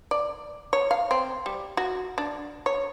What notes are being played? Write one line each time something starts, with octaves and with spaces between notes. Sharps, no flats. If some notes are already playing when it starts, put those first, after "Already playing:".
D5
C#5
F5
C4
G3
F#4
D4
C#5